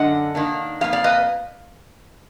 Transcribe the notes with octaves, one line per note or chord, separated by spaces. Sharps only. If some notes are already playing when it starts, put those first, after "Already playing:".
Already playing: F#2 D3 G#3 D4 D#5 F#5
D#3 A#3 D4
F2 F3 A#3 F5
D5 F5
B4 D#5